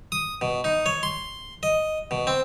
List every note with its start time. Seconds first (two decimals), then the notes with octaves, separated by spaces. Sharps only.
0.12 D#6
0.41 B2
0.64 D#4
0.86 C#5
1.03 C6
1.63 D#5
2.11 B2
2.27 C4